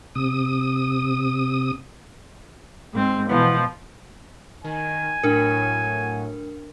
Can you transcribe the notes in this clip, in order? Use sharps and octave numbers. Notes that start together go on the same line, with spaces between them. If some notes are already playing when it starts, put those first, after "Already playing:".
C3 D#6
G#2 C4
B2 E3 F3 B3
D#3 G#5
A2 F#3 D4 A#4